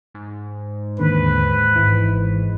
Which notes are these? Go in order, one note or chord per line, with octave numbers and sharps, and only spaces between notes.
G#2
D#2 D3 B4
G#1 E3